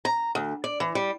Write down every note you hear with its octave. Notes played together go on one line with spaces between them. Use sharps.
A#5
D2
D5
E3
G3